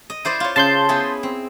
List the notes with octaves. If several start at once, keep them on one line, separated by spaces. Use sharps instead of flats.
D#5
E4 C5 D5
F4 C#5
C#3 A5 C6 G6
B3 E4 G#4
C4